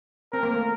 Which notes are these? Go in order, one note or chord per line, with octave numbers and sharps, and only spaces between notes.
C4 A#4
A#3
A3